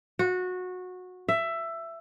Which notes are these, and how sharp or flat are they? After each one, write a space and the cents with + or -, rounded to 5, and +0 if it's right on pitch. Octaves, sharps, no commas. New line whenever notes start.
F#4 -20
E5 +15